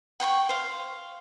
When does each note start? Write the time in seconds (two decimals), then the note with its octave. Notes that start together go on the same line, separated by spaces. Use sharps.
0.20 F#5 G5 C6 C#6
0.49 C5 F5